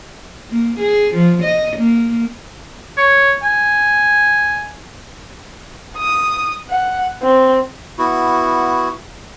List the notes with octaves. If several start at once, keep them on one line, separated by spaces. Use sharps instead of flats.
A#3
G#4
F3
D#5
A#3
C#5
G#5
D#6
F#5
C4
B3 E4 F#4